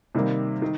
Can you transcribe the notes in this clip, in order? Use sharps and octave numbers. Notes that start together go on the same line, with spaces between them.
C3 D#3 G3 A#3
D#3